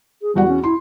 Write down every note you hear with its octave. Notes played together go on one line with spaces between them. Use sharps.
G#4
E2 G3 F#4 F#5
C#4
E4 C6